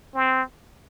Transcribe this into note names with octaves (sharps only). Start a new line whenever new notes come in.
C4